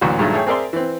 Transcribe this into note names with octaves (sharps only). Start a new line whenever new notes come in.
A1 D2 A#2 E3 F#3 F#4
G2 A#2 D#3 F#3 G#3 A3
A3 G#4 C#5 G5
C4 G#4 A#4 D5 E5 C6
E3 C4